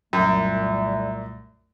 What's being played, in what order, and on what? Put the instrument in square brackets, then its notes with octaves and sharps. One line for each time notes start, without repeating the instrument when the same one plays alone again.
[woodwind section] C2 A#2 A3 [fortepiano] F#2